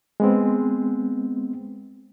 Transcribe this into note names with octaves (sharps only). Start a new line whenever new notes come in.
G#3 B3 C4